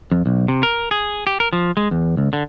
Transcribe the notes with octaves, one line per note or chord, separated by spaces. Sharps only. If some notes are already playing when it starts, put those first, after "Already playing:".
F2
B1
C3
A#4
G#4
G4
A#4
F3
G#3
E2
C#2
D3